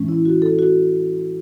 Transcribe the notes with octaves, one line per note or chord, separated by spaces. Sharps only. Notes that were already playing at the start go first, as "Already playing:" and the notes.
Already playing: A2 E3 G#3 C#4
E4
F#4
A4
F#4